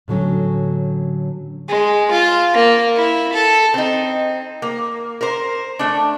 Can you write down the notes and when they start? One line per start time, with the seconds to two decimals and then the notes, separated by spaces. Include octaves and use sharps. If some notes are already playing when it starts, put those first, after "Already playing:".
0.08 A2 D3 F#3 C#4
1.69 G#3
2.11 F4
2.53 A#3
2.96 E4
3.33 A4
3.74 C4 D#4
4.62 A#3
5.21 A#4 C5
5.79 A3 D4